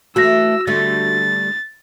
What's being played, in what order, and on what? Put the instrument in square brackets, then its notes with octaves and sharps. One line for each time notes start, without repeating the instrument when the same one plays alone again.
[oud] E3 A3 [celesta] F#4 A#6 [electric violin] E6
[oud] D3 G3 A3 [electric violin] A6